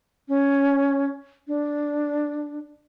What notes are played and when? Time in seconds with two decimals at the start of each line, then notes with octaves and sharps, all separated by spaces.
0.29 C#4
1.48 D4